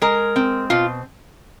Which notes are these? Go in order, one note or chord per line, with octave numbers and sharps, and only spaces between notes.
G#3 A#4
C4
B2 F4